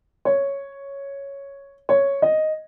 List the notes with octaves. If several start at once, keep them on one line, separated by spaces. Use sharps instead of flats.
C#5
C#5
D#5